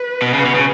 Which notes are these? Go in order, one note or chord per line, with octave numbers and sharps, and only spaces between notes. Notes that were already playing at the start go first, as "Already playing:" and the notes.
Already playing: B4
B2
C#3 B4
B2
C#3